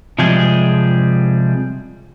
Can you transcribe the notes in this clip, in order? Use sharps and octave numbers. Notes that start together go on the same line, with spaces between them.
C3 F3 G3 G#3 G#4